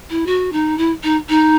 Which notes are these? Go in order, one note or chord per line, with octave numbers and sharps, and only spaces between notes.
E4
F#4
D#4
E4
D#4
D#4